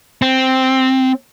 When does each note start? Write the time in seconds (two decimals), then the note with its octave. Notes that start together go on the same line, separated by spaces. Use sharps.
0.22 C4